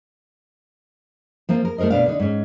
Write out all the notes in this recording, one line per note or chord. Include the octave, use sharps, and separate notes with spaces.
F3 A#3 C4 F4
A#4
A3 E4 A#4 C5 D#5
B2 D4 F5
D3 D#4
G#2 C#4